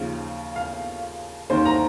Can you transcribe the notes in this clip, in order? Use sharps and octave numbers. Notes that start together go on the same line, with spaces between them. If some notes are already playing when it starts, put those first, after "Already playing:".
Already playing: D#2 C#3 F3 F5
F5
D#2 D#3 C5
A#5